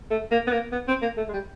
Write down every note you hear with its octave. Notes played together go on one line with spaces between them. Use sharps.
A3
A#3
B3
A#3
B3
C4
A#3
A3
G#3
G3